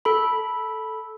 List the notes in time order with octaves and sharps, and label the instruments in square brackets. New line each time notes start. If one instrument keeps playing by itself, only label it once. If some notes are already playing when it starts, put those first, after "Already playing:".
[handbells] A4 B5